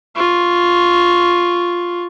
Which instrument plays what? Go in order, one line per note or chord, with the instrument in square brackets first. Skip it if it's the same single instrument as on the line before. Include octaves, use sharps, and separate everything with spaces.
[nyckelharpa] F4 C#6